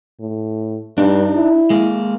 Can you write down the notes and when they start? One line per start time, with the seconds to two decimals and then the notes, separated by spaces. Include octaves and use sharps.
0.20 A2
0.98 G2 D4 D#4
1.35 E4
1.70 G#3 A#3